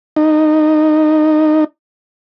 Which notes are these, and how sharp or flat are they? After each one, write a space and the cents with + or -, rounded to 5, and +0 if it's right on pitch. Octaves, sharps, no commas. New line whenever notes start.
D#4 -15